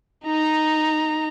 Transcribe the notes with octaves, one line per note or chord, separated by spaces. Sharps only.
D#4 A#5